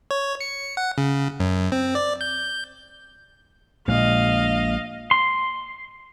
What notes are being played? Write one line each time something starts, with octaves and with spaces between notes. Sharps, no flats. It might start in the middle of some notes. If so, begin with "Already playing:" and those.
C#5
C#7
F#5
C#3
F#2
C4
D5
G6
A#1 A#2 G#3 D#5 F5
C6